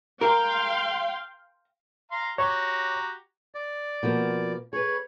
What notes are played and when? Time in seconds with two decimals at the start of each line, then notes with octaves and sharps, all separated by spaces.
0.21 A#4 F5 G5 C6
2.11 F5 A#5 C6
2.38 F#4 G4 C#5 A#5 C#6
3.55 D5
4.03 B2 F3 A#3
4.73 G#4 B4 C#5